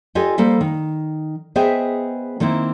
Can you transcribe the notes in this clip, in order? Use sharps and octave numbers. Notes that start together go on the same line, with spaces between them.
F4 G4 A4 D#5 G#5
G3 A#3 A4 C5
D#3
B3 G#4 C5 D#5 E5 G5
D#3 A#3 C4 E4